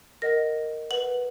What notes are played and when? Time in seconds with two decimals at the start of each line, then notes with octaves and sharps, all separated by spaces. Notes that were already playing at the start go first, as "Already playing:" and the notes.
0.22 A#4 D#5 F#5 A#6
0.90 B4 F#5 F#7